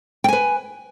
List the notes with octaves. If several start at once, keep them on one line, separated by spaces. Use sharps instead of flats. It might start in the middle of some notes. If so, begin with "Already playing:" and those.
B4 G5 G#5